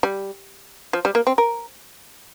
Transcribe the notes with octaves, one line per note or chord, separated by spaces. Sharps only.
G3
F3
G3
A#3
C4
A#4